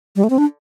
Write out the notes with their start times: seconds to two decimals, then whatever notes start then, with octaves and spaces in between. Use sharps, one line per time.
0.16 G3
0.24 A3
0.30 C4
0.38 D4